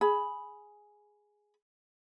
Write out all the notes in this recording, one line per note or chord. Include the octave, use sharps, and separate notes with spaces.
G#4 B5